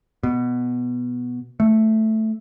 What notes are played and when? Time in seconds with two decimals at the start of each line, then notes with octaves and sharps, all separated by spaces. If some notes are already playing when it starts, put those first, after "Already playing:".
0.23 B2
1.60 A3